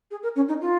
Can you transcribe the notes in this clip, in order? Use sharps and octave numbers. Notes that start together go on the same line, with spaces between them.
G#4
A#4
C#4
D#4
F4